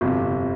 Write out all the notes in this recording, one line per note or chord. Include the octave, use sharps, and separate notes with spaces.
G1 F2 C3